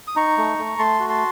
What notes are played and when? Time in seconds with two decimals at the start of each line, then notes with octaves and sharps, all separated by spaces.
0.07 D#6
0.16 D#4 A#5 C#6
0.38 A3
0.58 A3
0.79 A3 A5 C6
1.00 F#4
1.09 A5 C6